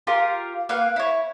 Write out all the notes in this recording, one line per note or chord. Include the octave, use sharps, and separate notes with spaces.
F4 G4 A#4 C6
A#3 B4 F5 F#5
E4 C#5